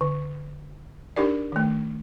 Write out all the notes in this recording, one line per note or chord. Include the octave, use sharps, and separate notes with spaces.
D3
D4 D#4 G4 A#4 D5
D#3 A3